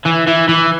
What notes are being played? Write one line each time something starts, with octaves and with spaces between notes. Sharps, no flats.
E3
E3
E3